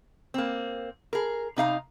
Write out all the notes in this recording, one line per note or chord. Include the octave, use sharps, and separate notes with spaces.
A#3 C4
G#4 A#4
C3 D#4 F5 A#5